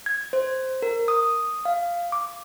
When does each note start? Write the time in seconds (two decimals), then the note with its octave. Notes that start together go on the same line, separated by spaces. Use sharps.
0.06 G#6
0.33 C5
0.82 A#4
1.08 D#6
1.65 F5
2.12 D6